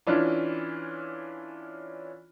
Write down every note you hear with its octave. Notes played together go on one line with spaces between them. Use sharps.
E3 C#4 D4 E4 F4